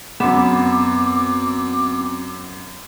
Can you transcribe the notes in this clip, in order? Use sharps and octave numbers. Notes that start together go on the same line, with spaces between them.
F#2 B3 C4 D6 E7